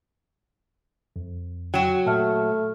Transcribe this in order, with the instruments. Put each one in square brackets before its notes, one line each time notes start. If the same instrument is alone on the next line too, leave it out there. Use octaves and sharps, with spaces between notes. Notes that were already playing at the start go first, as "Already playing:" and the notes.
[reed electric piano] F2
[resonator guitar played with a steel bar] F#3 F#4 [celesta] G5 E7
[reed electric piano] A#2 E5 [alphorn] A3 [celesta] A5 F6